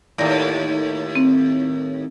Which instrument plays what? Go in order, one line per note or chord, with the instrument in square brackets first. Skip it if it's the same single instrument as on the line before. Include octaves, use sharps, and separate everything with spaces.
[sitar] D#2 A2 [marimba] D5 A#6
[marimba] C4